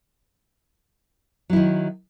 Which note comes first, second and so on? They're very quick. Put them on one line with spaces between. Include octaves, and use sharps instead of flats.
F#3 E4 D#3